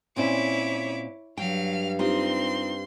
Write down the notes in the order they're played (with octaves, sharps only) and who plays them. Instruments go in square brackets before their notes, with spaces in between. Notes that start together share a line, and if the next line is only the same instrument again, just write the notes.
[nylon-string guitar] A#2 C4 C#4 [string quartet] E4 C#5 [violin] D6 B6
[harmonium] G2 [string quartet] F#3 [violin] F5 F6 [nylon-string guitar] G5
[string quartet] C4 [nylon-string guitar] D#4 F4 G4 [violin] C6